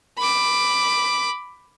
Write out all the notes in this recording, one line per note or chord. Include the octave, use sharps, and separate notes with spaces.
B5 D6